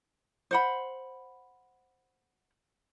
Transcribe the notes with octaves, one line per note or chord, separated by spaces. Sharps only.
C5 F#5 B5